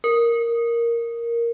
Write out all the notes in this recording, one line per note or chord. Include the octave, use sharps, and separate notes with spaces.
A#4